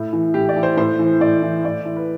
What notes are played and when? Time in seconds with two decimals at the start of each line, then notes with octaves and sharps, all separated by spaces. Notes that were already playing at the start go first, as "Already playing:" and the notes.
Already playing: A2 E4
0.13 E3
0.34 A2 G4
0.49 D5
0.56 E3
0.63 C5
0.77 A2 C5
0.99 E3
1.20 A2 D5
1.42 E3
1.65 A2 D5
1.85 E3
1.96 B4